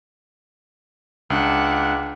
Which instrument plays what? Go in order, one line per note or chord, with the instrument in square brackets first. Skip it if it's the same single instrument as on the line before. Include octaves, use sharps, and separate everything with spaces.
[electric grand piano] C#2 [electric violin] D4 F#5